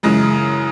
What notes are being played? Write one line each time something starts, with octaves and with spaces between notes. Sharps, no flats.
F#2 C#3 E3 G#3